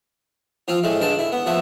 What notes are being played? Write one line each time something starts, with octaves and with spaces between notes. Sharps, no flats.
F3 C4 F4
A2 G#3 A3
G2 D3 G#3 A5
E4
B3
F3 A3 B3 E5